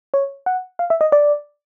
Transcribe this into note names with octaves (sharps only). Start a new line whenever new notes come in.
C#5
F#5
F5
E5
D#5
D5